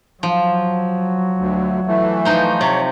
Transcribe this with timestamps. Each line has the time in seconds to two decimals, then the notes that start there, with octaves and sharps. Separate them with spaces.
0.23 F3 F#3
1.37 D2
1.87 E3 A3
2.25 F3 D#4 C5
2.61 C3 C#5